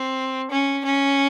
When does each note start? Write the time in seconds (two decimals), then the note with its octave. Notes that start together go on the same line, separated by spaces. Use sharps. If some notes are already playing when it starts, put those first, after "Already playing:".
Already playing: C4
0.51 C#4
0.85 C#4